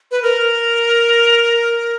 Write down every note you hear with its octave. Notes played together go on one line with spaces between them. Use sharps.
B4
A#4